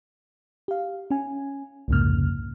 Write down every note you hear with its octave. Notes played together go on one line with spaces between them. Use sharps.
G4 F5
C#4 G#5
C2 F2 G#2 C#3 A#3 F6